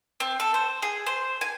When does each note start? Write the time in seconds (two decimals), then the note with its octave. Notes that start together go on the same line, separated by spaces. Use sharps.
0.20 C4
0.40 A4
0.54 C5
0.82 G#4
1.07 C5
1.41 G#5